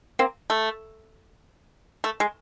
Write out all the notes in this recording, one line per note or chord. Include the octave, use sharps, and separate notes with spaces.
A#3 C4
A3
A3
G#3